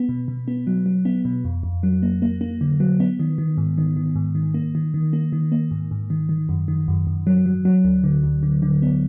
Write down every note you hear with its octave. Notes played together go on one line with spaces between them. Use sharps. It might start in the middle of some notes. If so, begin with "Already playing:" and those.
Already playing: B3
B2
B2
B3
F#3
F#3
B3
B2
F2
F2
F#3
A#3
A#3
A#3
D3
F#3
B3
D#3
D#3
G#2
D#3
D#3
G#2
D#3
A#3
D#3
D#3
A#3
D#3
A#3
G#2
G#2
D#3
D#3
F#2
D#3
F#2
F#2
F#3
F#3
F#3
D2
D3
D2
D3
D3
B3